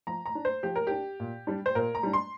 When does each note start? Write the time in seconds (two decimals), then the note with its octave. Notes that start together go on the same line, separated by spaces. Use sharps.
0.07 F3 A#5
0.26 A#5
0.35 D4
0.45 C5
0.63 F3 G4
0.75 A#4
0.87 D4 G4
1.20 A#2
1.47 G3 D4
1.66 C5
1.75 A#2 A#4
1.95 A#5
2.03 G3 D4
2.13 C6